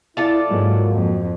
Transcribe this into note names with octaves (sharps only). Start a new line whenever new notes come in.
E4 F4 A4 D5
G#2 F#3 G#3 A#3 F#4
F2